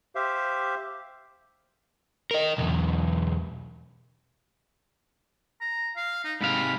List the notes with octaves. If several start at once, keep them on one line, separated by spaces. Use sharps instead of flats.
G4 C5 E5 F5
A#4 D#5
B1 E2
A#5
F5
D#4
G#2 C3 F5 B5